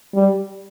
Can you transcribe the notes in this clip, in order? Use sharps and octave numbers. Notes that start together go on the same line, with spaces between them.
G3